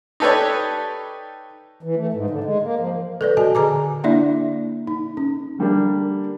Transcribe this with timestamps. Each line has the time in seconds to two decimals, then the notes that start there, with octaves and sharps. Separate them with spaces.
0.20 D#4 G4 A4 B4 C#5 D5
1.83 E3
1.96 A3
2.13 G#2
2.30 D3
2.44 G#3
2.62 A#3
2.78 F3
3.21 A4 B4 D5
3.37 F#4 D#5 G#5 A5
3.55 D3 G#4 G#5 A#5 D6
4.04 A#3 D4 E4 D5 E5
4.87 D#4
5.17 C#4
5.59 D3 G3 A#3 D4